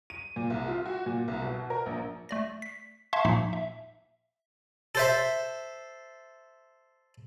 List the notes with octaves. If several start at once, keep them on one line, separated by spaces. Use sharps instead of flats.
D#7
A#2
C2
F4
F#4
A#2
C2
B2
A#4
A#1
A3 D5 A#6
B6
E5 F5 A5 C6 C#6 G#6
A#2 F3 A#3 D#4 F5 B6
E5
A4 C5 E5